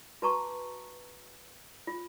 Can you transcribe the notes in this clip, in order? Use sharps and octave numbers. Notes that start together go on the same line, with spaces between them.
F#4 B4 A5 A#5 C#6 D6
F4